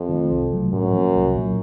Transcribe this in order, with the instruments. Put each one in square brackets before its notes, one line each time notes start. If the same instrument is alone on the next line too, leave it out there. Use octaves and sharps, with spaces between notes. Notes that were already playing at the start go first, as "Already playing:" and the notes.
Already playing: [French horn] F2
[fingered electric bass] D#3 F#3
A3
C2
C3 F#3 A3
[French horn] F#2 [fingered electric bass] A2
[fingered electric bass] F3 A#3
C2
A#2 F#3